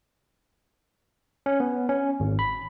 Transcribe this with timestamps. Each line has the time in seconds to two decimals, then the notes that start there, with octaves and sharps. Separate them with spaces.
1.46 C#4
1.60 B3
1.89 C#4
2.20 G#1
2.39 B5